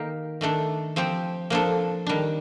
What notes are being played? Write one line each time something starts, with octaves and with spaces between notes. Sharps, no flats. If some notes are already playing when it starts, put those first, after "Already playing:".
Already playing: D#3 A#3 D#4 G4 A#4
D#3 A3 D4 A4
F3 C4 G4
F3 A#3 D4 A4
D#3 G3 D4